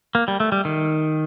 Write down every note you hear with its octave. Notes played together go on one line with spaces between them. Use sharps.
A#3
G3
A3
G3
D#3